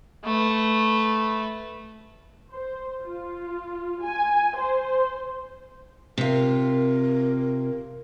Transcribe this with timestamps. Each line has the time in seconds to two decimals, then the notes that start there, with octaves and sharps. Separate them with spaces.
0.25 A3 B4
2.51 C5
3.02 F4
4.03 G#5
4.57 C5
6.18 C3 F4 A#4